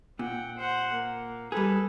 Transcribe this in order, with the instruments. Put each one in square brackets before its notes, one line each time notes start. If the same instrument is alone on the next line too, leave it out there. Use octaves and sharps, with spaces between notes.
[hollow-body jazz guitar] A#2 [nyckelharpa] F#5 G5
[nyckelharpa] C5 F#5
A#3
[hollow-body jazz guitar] G3 G#4 [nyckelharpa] A4 B4